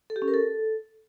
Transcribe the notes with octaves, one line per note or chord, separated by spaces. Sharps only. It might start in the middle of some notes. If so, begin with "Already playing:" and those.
A4
G4
C#4
A#4
A4